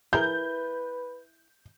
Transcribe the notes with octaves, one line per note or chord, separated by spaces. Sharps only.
E4 G#4 A#4 B4 G6